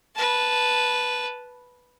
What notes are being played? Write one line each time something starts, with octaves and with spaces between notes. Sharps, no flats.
B4 A5